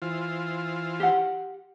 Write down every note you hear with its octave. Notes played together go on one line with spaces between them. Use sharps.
E3 F4 C5
G4 F#5